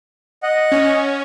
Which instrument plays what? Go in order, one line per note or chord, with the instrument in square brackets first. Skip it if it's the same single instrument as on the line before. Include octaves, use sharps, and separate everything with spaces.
[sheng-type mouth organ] D#5 F#5
[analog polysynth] C#4